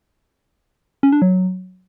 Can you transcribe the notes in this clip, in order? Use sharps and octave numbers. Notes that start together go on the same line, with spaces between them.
C#4
D4
F#3